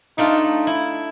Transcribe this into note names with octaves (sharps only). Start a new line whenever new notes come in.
A3 D4 D#4 F4
E4